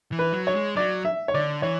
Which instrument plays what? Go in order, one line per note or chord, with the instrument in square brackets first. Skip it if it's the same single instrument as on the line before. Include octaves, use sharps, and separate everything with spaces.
[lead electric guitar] E3
[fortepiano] B4
[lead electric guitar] F#3
[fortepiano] C#5
[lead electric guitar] G#3
[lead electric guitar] F#3 [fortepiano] D5
[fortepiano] E5
C#5
[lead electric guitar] D3 [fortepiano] D5
[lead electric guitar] E3 [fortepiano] C#5